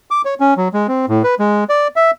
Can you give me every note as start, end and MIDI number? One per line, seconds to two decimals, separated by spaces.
0.11 0.22 86
0.25 0.34 73
0.40 0.54 61
0.57 0.68 54
0.74 0.87 56
0.88 1.06 60
1.09 1.23 45
1.24 1.35 71
1.39 1.64 56
1.69 1.88 74
1.96 2.11 76